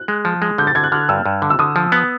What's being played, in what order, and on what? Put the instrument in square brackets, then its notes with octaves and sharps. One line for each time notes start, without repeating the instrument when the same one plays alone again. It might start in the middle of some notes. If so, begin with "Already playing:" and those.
Already playing: [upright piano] F#6
[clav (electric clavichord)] G#3
F3
G#3
[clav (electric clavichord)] D3 [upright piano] G6
[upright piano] A6
[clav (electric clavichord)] D3 [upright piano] G#6
[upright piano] F#6
[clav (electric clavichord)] D3 [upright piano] F6
[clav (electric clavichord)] G2 [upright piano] E6
[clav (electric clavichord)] G2
D3
[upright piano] E6
[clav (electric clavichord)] D3 [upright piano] D#6
[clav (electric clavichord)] F3
B3